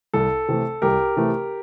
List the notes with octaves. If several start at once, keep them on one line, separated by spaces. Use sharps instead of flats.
C2 A4
C3 E3 A3
C2 G4 A#4
C3 E3 A3